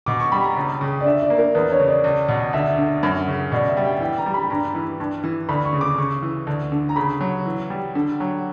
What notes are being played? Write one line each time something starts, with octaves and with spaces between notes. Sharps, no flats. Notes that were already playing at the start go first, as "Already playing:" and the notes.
B2 D6
C#6
G3 B5
A#5
C#2
C#3
D5
D3 E5
D5
A#3
A#4
E2 B4
C#5
C#3
D5
C#2
B2
D2 E5
D3
F#2
C#3
B2 D5
E5
G3
G5
E3 G5
A#5
G3
B5
G5
G2 A#5
E3
G2
E3
D2 B5
C#6
C#3
D6
C#3 C#6
E3
D2
D3
A#5
C#3 B5
F#3
E3
G3
D3
F#3